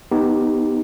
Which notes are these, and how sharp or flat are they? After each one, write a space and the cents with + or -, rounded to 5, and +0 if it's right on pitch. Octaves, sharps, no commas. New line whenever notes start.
B3 +0 D#4 +0 G4 +0